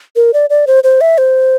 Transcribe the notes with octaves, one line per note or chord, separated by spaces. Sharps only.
A#4
D5
D5
C5
C5
E5
C5